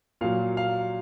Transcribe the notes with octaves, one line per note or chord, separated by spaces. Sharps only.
A#2 F#3 F5
F5